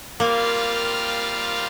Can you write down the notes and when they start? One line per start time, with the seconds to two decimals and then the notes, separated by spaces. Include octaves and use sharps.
0.20 G3 A#3 C4 F4 A#4 F5